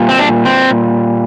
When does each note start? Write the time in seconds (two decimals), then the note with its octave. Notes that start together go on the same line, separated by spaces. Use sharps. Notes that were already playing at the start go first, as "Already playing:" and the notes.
Already playing: A#2 G3
0.09 C4
0.19 D4
0.45 C4